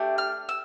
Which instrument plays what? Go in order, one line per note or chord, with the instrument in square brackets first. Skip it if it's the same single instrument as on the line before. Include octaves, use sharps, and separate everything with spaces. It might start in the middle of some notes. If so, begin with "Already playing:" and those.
Already playing: [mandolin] A3 D4 G4
F6
E6